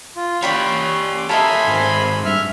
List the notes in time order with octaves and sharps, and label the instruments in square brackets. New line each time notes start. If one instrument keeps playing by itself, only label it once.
[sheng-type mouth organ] F4
[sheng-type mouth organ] C#4 C6 [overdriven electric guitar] G4 C#5 [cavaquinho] D5 G5 B5
[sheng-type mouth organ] D6
[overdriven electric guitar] F4 D#5 [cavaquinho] A4 A#4 E5 [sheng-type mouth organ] G#5 B5 C6
[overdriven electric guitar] G#2 C4
[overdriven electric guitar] G2 [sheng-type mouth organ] E5 F6